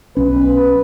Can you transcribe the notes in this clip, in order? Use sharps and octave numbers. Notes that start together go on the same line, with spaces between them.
B1 C#4 B4